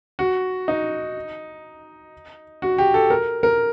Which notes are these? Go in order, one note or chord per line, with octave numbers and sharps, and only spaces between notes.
F#4
D#4
F#4
G4
A4
A#4
A#4